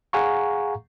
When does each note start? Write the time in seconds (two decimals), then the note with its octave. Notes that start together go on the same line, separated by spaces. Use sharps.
0.13 G#4 F5 F#5 G#5 A#5 C#6